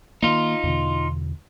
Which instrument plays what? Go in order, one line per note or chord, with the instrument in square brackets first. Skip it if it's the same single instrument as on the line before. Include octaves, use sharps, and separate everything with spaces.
[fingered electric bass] D#3 E3 A#3 [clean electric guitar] D#4 F4
[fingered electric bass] E2 B2 D3